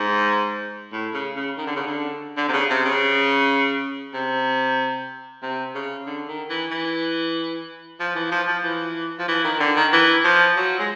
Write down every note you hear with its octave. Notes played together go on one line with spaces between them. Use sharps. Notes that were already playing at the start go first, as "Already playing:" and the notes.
Already playing: G#2
A2
C#3
C#3
D#3
D3
C#3
D3
D3
C3
C#3
C3
C#3
C3
C3
C#3
D3
D#3
E3
E3
F3
E3
F3
F3
E3
F3
E3
D#3
D3
D#3
E3
F3
F#3
G#3